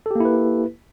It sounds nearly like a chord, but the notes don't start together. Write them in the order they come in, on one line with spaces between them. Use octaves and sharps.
A4 G4 A#3 E4 B4